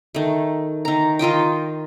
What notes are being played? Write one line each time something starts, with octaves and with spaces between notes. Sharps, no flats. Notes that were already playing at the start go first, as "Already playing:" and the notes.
D#3 A3
D#3 A#5
D#3 F4 D#5 G5